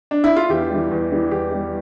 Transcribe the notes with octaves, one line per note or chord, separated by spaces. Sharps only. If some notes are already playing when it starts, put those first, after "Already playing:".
D4
E4
F4
E2 G4
E3 G3
E2
E3 G3
E2 G4
E3 G3